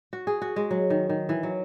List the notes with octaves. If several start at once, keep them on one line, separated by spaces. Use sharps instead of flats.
F#4
G#4
F#4
G#3
F#3
D#3
D#3
E3
F#3